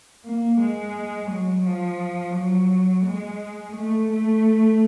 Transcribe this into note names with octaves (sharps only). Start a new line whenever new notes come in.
A#3
G#3
F#3
F3
F#3
G#3
A3
A3